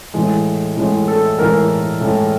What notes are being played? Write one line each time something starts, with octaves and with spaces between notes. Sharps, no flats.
A2 E3 G#3
A2 E3 G#3
A4
A2 E3 G#3 A#4
A2 E3 G#3